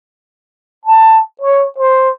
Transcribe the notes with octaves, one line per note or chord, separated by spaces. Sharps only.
A5
C#5
C5